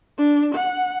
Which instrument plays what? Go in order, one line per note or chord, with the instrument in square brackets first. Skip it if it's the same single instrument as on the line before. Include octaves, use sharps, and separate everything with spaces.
[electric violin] D4
F#5